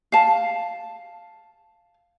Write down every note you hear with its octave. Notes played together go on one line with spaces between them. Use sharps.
F5 A5